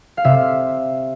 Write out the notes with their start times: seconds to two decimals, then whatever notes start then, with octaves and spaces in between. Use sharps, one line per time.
0.17 F5
0.24 C3 E5